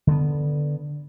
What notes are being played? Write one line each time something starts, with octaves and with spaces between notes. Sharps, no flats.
D3 B3